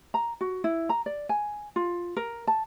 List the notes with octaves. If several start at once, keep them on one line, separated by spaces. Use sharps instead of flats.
A#5
F#4
E4
A#5
D5
G#5
F4
A#4
A5